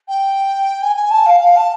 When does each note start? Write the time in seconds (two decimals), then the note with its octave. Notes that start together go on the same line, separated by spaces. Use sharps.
0.08 G5
0.82 G#5
0.96 G#5
1.10 A5
1.26 F5
1.40 F5
1.56 A5